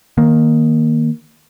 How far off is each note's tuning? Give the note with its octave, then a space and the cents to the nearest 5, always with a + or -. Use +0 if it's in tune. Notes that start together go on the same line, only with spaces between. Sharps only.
D#3 +0 A#3 +0